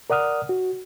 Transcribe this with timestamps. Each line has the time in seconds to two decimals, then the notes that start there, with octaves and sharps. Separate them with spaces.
0.10 A#4 D5 F#5 D#6 F6
0.49 F#4